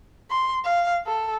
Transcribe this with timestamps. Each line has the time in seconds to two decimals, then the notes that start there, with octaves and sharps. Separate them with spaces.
0.31 C6
0.64 F5
1.07 A4